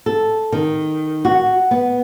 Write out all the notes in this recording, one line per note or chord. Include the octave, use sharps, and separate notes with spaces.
A4
D#3
F#4
B3